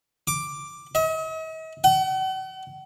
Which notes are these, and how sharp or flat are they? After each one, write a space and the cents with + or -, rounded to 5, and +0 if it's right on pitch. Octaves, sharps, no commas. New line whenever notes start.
D6 +5
D#5 +45
F#5 +45